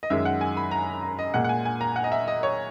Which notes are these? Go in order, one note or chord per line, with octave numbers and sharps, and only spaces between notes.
D#5
F#2 D#3 G#3 E5
F#5
G#5
B5
A#5
A#5
D#5
A#2 G#3 F#5
F#5
G#5
G#5
A#5
F#5
D#5
E5
D#5
C#5